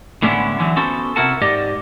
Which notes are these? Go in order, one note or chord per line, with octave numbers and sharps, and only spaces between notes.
A2 D3 G#3 B3 C#4 E4
D3 E3 F#3
B3 C#4 F#4 A4 C5
C3 E4 F#4 A#4 F#5 A5
G#2 G4 D5 D#5